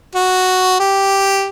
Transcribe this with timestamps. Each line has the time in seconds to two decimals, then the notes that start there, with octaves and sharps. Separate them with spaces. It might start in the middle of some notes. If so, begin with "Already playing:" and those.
0.15 F#4
0.80 G4